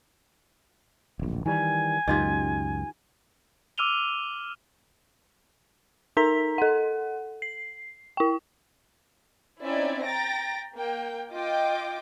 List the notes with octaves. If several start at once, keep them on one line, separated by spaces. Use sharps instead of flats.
D1 A#1
D#3 E3 G3 G#5
C#2 F#2 D#3 F4 G4
D6 E6 F6 D#7 F7 G7
D#4 A#4 A#5 B6
A4 F#5
C7
E4 G5
C4 C#4 D#4 E4 D5 E5
G5 A#5 A6 A#6 D7
A#3 G5
F4 D#5 G5 D6